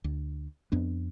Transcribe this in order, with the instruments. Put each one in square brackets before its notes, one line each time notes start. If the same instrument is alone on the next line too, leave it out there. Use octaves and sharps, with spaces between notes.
[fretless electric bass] D2
F2 B3 D4